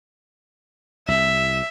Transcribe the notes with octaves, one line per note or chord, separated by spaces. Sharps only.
C2 E5